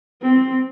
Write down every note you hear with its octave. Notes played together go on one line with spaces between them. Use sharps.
C4